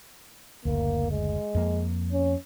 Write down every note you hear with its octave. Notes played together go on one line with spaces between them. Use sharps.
F#1 D2 A#3
G#3
F2 A#3
C#4